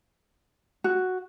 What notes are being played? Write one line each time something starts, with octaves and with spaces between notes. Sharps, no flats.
F#4